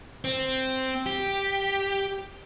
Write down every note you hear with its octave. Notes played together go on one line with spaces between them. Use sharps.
C4
G4